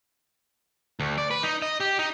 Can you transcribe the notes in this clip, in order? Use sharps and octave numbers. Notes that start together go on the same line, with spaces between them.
D2
D5
B4
D#4
D#5
G4
D#4